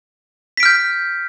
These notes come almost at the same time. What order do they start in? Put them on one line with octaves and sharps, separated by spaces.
B6 D7 F6 G6